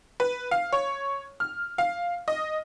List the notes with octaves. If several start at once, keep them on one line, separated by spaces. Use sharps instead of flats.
B4
F5
C#5
F6
F5
D#5